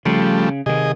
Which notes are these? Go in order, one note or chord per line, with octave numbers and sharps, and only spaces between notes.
C#3 F3 G3 A3
C3 D#3 G#4 D#5